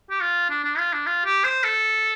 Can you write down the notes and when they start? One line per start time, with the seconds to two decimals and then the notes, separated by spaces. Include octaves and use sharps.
0.10 G4
0.21 F4
0.50 D4
0.64 D4
0.78 F4
0.93 D4
1.06 F4
1.25 G4
1.45 C5
1.64 A4